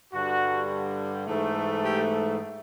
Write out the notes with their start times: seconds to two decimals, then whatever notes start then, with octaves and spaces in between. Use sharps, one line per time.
0.13 G2 D3 G3 F#4
1.26 G#2 E3 A3
1.82 G4